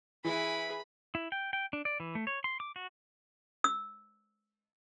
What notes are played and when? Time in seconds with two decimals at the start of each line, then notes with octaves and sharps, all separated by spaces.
0.24 E3 E4 G#4 B4 B5
1.15 E4
1.32 G5
1.53 G5
1.73 D4
1.85 D5
2.00 E3
2.15 A3
2.27 C#5
2.44 C6
2.60 D6
2.76 F#4
3.64 E6